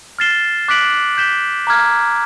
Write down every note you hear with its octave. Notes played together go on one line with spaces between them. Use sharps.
F6 A6 C7 E7 G7
D6 F#6 B6 D7 F#7
G6 B6 E7 G7
A#5 D6 F6 G#6